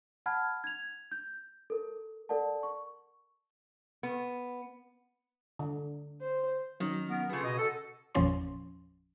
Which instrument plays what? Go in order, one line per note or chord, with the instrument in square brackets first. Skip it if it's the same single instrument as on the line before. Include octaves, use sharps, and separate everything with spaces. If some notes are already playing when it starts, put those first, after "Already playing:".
[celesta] F#5 A5 B5 F6 G#6
G#6 F7
G6
A4 A#4
A4 A#4 D5 F#5 A5
C#6
[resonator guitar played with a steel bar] B3
[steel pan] D3
[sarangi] C5
[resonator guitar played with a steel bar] D#3 [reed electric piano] F#3 C#4
[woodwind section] B3 A#4
[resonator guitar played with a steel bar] C#3 B3 [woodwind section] F4 G#4 A4
[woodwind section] B2 D#5
[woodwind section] A4 [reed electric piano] F#5
[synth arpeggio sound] G1 E2 A#2 F3 C#4 C6